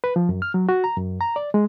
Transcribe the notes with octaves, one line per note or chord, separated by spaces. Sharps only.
B4
F3
F#2
F6
F#3
F#4
A#5
F#2
A#5
D5
G#3